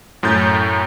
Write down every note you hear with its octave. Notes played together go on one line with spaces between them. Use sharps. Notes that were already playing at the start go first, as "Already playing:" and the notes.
F#2 A2 C#4 G6 A6